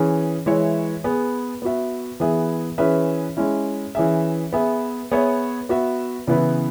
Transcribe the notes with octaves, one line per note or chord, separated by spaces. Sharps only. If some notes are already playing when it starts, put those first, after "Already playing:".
Already playing: E3 C#4 G#4
E3 G#3 E4 C#5 E5
B3 G#4 B4
B3 F#4 E5
E3 B3 G#4 E5
E3 C#4 G#4 B4 E5
G#3 C#4 E4
E3 C#4 G#4 E5
B3 G#4 E5
B3 G#4 C#5 E5
B3 F#4 E5
C#3 E3 B3 E4 B4